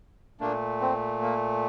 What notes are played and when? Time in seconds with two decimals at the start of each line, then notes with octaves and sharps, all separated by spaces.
0.40 A#2 A3 A#3 D4
0.81 C4
1.22 A#3